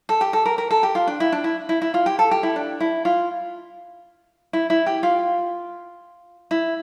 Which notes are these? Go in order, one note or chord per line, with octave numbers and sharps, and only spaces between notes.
A4
G4
A4
A#4
A#4
A4
G4
F4
D4
E4
D4
E4
E4
E4
F4
G4
A4
G4
E4
D4
E4
F4
E4
E4
G4
F4
E4